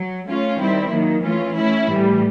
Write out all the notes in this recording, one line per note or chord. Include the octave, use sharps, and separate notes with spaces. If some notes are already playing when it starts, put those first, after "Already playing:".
Already playing: F#3
A3 C#4 F4
D#3 G3 C4 E4
D#3 F#3 A#3
E3 A3 C#4 F4
A3 C#4 E4
A2 E3 G3